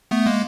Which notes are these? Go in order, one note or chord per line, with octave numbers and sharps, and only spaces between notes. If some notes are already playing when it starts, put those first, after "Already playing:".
A3 B3
G#3 A#3